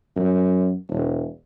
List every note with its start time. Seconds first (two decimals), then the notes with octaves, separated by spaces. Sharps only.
0.16 F#2
0.90 E1